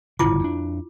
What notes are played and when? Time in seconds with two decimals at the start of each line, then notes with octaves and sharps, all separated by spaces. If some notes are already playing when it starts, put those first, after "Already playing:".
0.19 G1 A2 C#3 E4 F4 D6
0.40 F2 D4